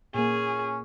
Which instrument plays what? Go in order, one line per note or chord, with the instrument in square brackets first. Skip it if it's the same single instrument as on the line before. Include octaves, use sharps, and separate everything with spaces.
[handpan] A#2 A#3 [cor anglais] C#4 [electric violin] G#4